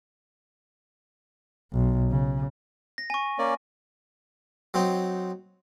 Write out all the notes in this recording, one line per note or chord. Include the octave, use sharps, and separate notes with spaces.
B1
C#3
A#6
G#5 C#6
A#3 C#4 D5
F#3 C4 D#4